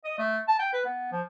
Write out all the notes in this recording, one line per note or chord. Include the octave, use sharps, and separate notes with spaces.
D#5
A3
A5
G5
B4
B3
F3